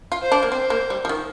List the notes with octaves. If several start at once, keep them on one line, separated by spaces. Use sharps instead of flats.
F4
C5
D4
A#3
C4 C5
A#3
G3
F3
D#3